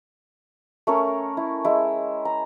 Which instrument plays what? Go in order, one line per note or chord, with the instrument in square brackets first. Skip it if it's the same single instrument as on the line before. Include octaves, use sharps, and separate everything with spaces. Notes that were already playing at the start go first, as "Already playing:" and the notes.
[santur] A3 C#4 A#4
E4
G#3 E4
A#5